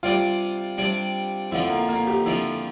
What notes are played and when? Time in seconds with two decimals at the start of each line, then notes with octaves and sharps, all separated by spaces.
0.03 C3 G3 D4 F4
0.78 C3 G3 D4
1.51 F2 D3 F3 E4
1.70 A#3
1.89 A#3
2.07 G4
2.26 F2 D3 F3 E4